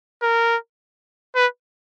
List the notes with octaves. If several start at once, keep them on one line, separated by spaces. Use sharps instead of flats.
A#4
B4